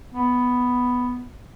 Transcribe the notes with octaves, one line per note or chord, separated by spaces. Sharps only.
B3